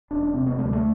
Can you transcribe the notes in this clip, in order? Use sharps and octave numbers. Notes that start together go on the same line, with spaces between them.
E1 D4
D4
C3 C4
B3
D2 A3
G3
A3